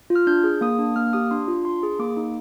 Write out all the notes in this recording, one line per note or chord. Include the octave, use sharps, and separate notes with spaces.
F4
F6
D4 G6
G#4
A#3 D#6
D4
A#3 F6
G4 D#6
D4 C6
F4
D4 C6
G#4
A#3 D6
D#4